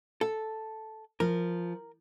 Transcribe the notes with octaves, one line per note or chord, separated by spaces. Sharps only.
A4
F3 A#4